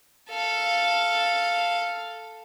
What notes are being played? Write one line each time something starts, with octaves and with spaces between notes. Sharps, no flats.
A4 F5